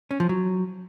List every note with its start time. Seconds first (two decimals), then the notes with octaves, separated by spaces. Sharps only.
0.11 C#4
0.20 F3
0.29 F#3